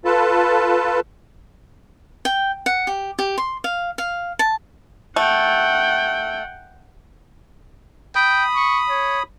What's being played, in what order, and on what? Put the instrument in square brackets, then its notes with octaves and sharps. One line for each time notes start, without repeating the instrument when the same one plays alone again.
[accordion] F4 A4 B4 A5
[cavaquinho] G5
F#5
G4
G4
C6
F5
F5
A5
[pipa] A3 [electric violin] F#5 G5
[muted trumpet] G5 [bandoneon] B5 D#6
[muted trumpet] C#6
C#5